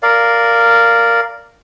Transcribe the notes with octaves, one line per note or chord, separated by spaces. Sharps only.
A#4 D5 F5